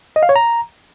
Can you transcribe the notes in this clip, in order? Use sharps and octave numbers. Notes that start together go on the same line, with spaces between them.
D#5
F5
C#5
A#5